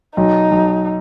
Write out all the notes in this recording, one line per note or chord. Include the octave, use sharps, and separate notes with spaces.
B1 D#4
B1